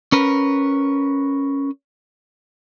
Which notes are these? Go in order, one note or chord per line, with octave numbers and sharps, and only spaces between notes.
C#4 A#4 B4